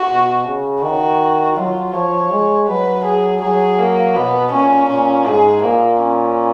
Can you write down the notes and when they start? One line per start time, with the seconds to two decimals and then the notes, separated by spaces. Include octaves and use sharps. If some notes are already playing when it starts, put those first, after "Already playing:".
Already playing: F#4
0.09 B2
0.46 C#3
0.82 D#3 F#4
1.56 F#3 F4
1.93 F3 C#5
2.31 G#3
2.68 F#3 B4
3.05 G#4
3.42 F#3 G#4
3.79 A#3
4.16 B2 B3
4.53 A#2 C#4
4.90 A#2 C#4
5.27 G#2 G#4
5.63 A#2 A#3
6.01 C#4